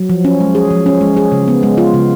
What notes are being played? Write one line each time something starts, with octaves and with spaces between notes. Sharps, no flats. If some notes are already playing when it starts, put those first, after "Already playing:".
Already playing: F#3
F3
C#4
G#3
G#4
F3
C#4
G#3
G#4
C#3
B3
G#3
F4
C#3